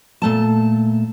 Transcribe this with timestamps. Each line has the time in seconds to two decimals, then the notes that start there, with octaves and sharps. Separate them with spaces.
0.22 A#2 A3 A5